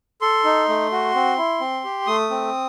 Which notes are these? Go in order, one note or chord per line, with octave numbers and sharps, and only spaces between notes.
A4 C6
D#4
A3
F#4
C4
E4
C4
G4
A3 D#6
C4